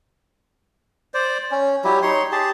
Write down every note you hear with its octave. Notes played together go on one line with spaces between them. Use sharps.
C5 D5
C#4
F#3 G3 E4 G4
D#4 C#5 C6
G4 G#4 A5